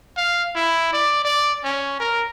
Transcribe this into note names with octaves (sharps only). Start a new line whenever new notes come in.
F5
E4
D5
D5
C#4
A#4